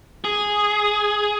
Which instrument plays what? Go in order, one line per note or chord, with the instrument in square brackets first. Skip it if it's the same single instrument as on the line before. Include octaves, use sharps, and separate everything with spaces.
[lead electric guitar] G#4